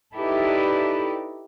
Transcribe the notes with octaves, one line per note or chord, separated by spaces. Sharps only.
D#4 E4 G4 A4 B4 D5